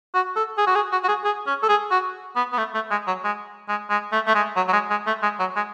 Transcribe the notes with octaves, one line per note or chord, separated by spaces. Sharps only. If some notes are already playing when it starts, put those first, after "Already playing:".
F#4
A4
G#4
F#4
G#4
F#4
F#4
G#4
G#4
C#4
A4
G#4
F#4
B3
B3
A3
A3
G#3
F#3
G#3
G#3
G#3
A3
A3
G#3
F#3
F#3
G#3
G#3
A3
G#3
F#3
G#3